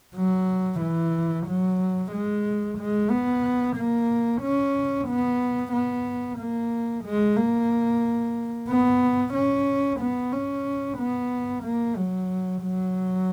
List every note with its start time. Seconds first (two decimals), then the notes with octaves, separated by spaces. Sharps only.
0.15 F#3
0.80 E3
1.47 F#3
2.12 G#3
2.78 G#3
3.10 B3
3.77 A#3
4.42 C#4
5.08 B3
5.73 B3
6.39 A#3
7.05 G#3
7.37 A#3
8.69 B3
9.34 C#4
10.00 B3
10.33 C#4
10.98 B3
11.64 A#3
11.97 F#3
12.63 F#3